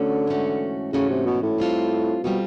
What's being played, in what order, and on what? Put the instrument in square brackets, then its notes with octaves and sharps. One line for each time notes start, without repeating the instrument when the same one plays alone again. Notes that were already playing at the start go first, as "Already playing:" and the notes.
Already playing: [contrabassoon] D3 [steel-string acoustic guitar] A3 C#4 F#4
[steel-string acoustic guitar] G#2 E3 A3 C#4 F#4
[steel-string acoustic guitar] G#2 E3 A3 C#4 F#4 [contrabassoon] C#3
[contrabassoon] C3
B2
A2
[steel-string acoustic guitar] G3 C4 F4 A4
[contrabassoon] B2 [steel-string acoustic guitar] G3 C4 F4 A4